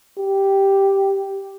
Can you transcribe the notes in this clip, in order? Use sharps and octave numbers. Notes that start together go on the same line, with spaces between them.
G4